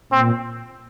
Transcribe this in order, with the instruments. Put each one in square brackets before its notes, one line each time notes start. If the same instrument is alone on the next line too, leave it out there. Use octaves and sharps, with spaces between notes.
[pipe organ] A#2 [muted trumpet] C4